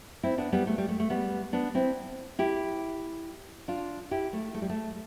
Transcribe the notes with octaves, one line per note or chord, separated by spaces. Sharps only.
C4 E4
B3 D4
G3 B3
A3
G3
A3
A3
G3 B3
B3 D4
C4 E4
E4 G4
D4 F4
E4 G4
A3
A3
G3
A3